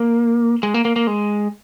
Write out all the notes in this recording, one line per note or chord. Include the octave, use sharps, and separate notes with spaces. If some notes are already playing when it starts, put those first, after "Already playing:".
Already playing: A#3
G#3
A#3
A#3
A#3
G#3